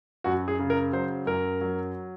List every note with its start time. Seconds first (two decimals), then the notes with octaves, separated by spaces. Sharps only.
0.24 F#2 F#4
0.48 G#4
0.59 C#3
0.70 A#4
0.93 F#3 C5
1.26 F#2 A#4
1.61 F#3